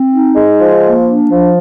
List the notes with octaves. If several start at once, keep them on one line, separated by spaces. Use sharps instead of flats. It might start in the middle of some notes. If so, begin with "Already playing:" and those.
Already playing: C4
D#4
G#3
F3
A#3
D4
F3